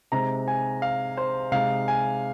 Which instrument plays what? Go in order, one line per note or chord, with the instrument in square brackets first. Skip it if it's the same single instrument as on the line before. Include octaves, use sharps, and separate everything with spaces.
[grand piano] C3 G#3 C4 D#4 A#5
G#5
F5
C5
C3 G#3 D#4 F5
G#5